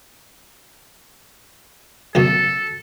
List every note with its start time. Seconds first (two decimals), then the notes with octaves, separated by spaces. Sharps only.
2.15 C#2 F#2 B2 A4